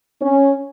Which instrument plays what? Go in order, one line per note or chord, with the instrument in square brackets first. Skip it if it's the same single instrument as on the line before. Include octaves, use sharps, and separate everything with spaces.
[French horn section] C#4